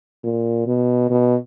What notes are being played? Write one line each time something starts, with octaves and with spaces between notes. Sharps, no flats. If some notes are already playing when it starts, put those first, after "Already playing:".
A#2
B2
B2